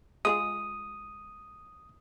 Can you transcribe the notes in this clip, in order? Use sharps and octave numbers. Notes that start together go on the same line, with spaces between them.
G#3 F4 G#4 D#6